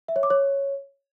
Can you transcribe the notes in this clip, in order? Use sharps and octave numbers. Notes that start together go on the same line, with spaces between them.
E5
C#5
D6
C#5